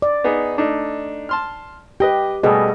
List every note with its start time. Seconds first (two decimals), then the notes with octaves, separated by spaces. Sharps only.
0.02 D5
0.24 B3 D#4 G#4
0.58 A3 D4 D#4
1.29 A5 C6 F6
2.00 G4 B4 D#5 G5
2.43 B2 G3 A3 G#4 D#5